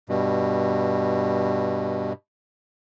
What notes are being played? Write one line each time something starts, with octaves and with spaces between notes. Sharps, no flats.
G2 B2